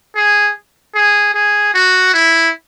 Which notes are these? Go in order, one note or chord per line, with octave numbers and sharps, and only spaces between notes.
G#4
G#4
G#4
F#4
E4